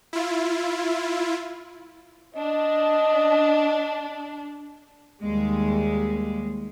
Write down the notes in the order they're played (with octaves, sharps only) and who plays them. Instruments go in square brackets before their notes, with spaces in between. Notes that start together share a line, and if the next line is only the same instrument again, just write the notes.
[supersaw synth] E4 F4
[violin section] D4 [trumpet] D#5
[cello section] D#2 G3 G#3